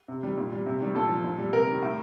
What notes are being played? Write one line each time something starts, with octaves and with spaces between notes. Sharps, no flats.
C3
D#3 G3
A#2
G3
C3
D#3 G3
A#2 A4
F3
A#2
G3
C3 A#4
D#3 G3
A2